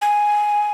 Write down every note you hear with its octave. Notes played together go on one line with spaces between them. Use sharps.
G#5